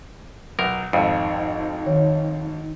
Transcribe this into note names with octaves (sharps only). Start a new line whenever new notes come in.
B1 A#4
G#1 F2 D#4
D#3 C#5